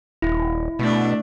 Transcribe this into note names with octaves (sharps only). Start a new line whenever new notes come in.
D#1 E4
B2 A3 D4